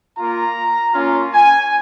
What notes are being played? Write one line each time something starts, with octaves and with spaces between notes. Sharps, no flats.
A#3 F4 A#5
A#3 C#4 F4
G#5